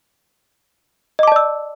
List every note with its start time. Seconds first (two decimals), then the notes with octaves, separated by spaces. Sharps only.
1.19 D#5
1.23 D6
1.27 A5
1.32 D5
1.36 E6